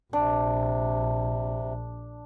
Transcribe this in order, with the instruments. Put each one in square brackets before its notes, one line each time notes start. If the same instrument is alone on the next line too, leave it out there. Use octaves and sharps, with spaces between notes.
[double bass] A#1 [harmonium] C3 [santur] D4